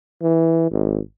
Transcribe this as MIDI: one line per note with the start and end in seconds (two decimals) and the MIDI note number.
0.22 0.68 52
0.71 0.99 32